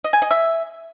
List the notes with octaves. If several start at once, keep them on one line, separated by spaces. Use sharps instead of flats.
D#5
G#5
D#5
E5